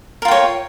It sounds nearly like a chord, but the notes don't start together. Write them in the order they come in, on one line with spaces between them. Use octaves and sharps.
A#4 F4 G5 C#5